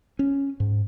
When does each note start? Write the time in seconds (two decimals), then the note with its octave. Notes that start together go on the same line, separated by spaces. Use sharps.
0.19 C#4
0.60 G#2